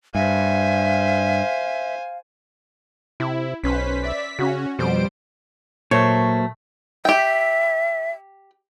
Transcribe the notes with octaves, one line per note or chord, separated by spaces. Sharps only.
G2 C5 E5 F5 G#5
C3 E4
B1 C#4 B4 C5 B6
D5 E5
C#3 C#4 F#4
F2 B2 G3 C5 D7
A#2 F#3 A3 A#3 C5 C#5
G4 E5 G5